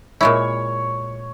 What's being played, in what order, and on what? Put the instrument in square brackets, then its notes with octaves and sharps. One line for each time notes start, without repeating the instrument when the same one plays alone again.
[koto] A#2 G#3 E4 [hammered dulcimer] C#5